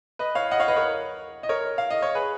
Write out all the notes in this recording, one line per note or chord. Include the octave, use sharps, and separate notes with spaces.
B4 D#5
C#5 F5
D#5 F#5
C#5 F5
B4 D#5
A#4 C#5
D#5
A#4 C#5
F5
D#5
C#5
G#4 B4